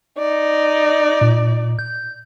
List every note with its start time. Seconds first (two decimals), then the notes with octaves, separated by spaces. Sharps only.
0.19 D#4 D5
1.21 A#2
1.79 G6